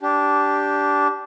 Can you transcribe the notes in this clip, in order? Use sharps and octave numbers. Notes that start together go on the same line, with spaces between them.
D4 G4